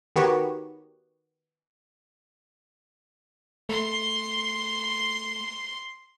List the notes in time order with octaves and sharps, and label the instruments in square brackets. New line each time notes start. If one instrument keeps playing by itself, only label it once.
[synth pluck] D#3 B3 F#4 G4 B4 C#5
[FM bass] A3 [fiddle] C6